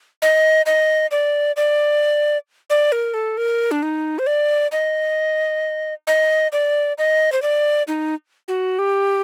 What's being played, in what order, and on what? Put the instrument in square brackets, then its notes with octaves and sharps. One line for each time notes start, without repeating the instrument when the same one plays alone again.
[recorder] D#5
D#5
D5
D5
D5
A#4
A4
A#4
D4
D#4
C5
D5
D#5
D#5
D5
D#5
C5
D5
D#4
F#4
G4